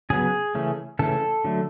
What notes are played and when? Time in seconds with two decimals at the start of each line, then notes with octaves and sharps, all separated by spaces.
0.10 C#3 F#3 B3 G#4
0.55 C#3 E3 A3 C#4
0.99 C#3 E3 A3 C#4 A4
1.45 D3 F#3 A3